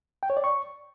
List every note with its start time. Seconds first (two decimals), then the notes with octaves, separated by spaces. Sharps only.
0.23 G5
0.30 C#5
0.37 D5
0.44 C#6